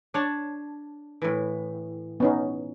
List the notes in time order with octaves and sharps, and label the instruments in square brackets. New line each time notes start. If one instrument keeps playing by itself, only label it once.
[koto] D4 C#5 A5
A2 E3
[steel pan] B3 C#4 D#4